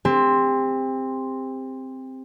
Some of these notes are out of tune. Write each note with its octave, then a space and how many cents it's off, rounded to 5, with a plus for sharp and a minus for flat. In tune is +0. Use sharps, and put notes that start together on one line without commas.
C4 +0 G4 +35